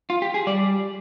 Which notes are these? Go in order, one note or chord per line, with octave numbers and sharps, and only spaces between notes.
F4
G4
G#4
G3 D5